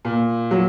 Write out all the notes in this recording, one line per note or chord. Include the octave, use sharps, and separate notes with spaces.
A#2
F#3